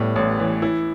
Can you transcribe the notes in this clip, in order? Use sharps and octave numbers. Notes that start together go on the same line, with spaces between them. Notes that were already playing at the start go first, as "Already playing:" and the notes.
Already playing: A2 G3 B3
A1
E3
E4